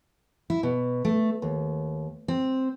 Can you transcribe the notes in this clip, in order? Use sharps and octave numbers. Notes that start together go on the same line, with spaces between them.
E4
B2
A3
D#2
C4